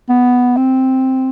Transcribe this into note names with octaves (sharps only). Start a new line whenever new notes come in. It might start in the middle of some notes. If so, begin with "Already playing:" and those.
B3
C4